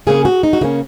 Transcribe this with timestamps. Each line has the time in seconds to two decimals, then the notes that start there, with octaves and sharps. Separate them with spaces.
0.07 C#3 A#3 C#4 G#4
0.25 F#4
0.43 D#4
0.53 F#4
0.61 C#3 A#3 C#4 D#4